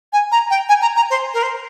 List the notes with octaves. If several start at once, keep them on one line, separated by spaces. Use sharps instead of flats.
G#5
A#5
G5
G#5
A#5
A#5
C5
A#4
C5